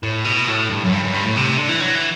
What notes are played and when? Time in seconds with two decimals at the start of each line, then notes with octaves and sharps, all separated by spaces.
0.03 A2
0.25 B2
0.47 A2
0.69 G2
0.84 F#2
0.92 G2
1.03 F#2
1.14 G2
1.24 A2
1.36 C3
1.57 D3
1.69 E3
1.80 F#3
1.95 E3